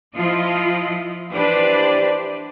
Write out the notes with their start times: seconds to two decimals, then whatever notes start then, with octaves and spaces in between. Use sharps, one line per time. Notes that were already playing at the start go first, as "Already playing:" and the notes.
0.16 F3 E4 F4 D#5
1.32 E3 D4 G4 B4 C5 D5